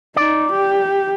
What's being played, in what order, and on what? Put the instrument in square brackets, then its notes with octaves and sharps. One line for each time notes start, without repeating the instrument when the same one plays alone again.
[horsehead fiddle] D#4 [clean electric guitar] D5
[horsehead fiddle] G4